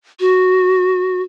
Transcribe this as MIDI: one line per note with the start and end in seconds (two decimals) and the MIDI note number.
0.20 1.22 66